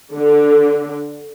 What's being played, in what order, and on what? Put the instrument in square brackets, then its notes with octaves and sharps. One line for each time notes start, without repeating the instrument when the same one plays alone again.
[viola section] D3